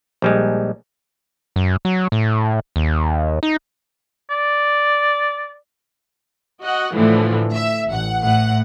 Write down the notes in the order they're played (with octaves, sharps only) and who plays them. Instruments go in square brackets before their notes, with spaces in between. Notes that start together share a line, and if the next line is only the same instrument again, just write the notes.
[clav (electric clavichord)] A#1 G3 G#3
[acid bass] F#2
F#3
A2
D#2
D#4
[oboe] D5
[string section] F#4 D#5 F#5
A2 D3 E3 F3
E5
A1 F#5
A2 F#5